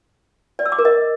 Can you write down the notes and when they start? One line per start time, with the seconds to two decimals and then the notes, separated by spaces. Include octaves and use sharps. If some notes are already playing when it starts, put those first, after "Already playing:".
0.59 D5
0.66 E6
0.72 D6
0.79 A#4
0.85 D#5